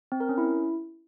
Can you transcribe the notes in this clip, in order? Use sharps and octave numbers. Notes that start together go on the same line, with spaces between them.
C4
A#4
C#4
E4